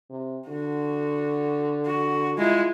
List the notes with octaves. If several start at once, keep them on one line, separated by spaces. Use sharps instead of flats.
C3
D3 F#4
F#4
G#3 E4 F4